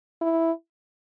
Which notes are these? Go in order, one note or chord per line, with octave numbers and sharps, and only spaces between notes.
E4